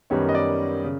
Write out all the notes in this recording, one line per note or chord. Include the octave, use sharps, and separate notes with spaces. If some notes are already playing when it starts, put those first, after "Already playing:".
F#2 D#3 G3 B3 C#5
D#5
D5
C#3